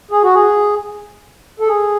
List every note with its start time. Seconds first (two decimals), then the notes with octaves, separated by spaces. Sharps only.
0.11 G#4
0.23 F#4
0.35 G#4
1.60 A4
1.68 G#4